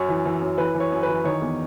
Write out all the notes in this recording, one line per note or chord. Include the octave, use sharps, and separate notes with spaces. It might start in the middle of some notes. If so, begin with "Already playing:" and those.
Already playing: F#2 C#5
E3
E3
F#2
E3 B4
E3
C#5
F#2
B4
E3
D#3 C#5
E2